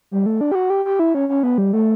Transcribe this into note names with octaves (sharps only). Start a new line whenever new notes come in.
G3
A3
D4
G4
F#4
G4
G4
E4
C#4
C#4
B3
G3
A3